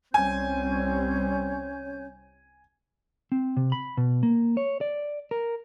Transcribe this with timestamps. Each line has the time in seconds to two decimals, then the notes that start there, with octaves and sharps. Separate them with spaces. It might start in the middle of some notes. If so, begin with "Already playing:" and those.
0.14 C2 G3 C4 C#4 C#5 G#5 G6
3.32 C4
3.57 C3
3.72 B5
3.97 B2
4.23 A#3
4.57 C#5
4.81 D5
5.31 A#4